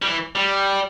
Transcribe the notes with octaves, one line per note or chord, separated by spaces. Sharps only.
G3
E3
G3